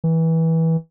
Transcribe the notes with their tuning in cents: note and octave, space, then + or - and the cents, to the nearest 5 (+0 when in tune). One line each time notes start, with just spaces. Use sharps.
E3 -20